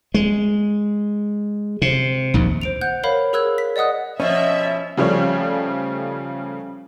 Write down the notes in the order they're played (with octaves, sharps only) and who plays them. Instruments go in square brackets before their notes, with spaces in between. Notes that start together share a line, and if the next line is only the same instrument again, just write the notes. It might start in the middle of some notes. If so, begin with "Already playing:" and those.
[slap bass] G#3
C3
A#1 D#2
[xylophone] C5 D7 F7
F#5 F#6 G6
A#4 C#5 F5 B5
G#4 A#4 E6 F#6 G#6
B6
D5 D#5 F#5 D#6 F#6
[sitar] B2 F3 [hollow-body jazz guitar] C#4 [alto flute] D#5 [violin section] E5
[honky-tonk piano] C#3 F3 G3 A3 C#5